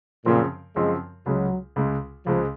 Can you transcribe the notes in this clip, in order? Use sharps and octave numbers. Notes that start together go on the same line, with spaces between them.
F#2 A#2 C#3 F3 C4
F#2 C#3 F3 G#3 C4
C#2 C#3 F#3 G#3
C#2 C#3 G#3
C#2 C#3 F3 G#3